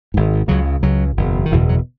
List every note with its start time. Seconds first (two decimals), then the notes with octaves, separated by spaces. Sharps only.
0.14 G#1 G#2
0.48 C#2 C#3 F#3
0.83 C#2 C#3 F#3
1.17 F#1 E2 B2
1.46 D#3
1.52 F#1 E2 B2 E3
1.69 F#3